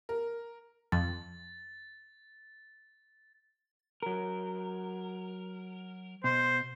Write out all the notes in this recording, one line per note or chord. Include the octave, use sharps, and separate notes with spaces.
A#4
F2 A6
F#3 A#4
B2 C5